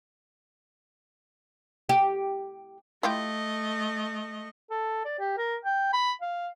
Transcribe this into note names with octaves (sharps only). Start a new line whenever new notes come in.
G4
A3 E4 F4 G4 D#5
A4
D5
G4
A#4
G5
B5
F5